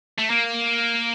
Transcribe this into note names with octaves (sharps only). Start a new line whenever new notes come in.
A3
A#3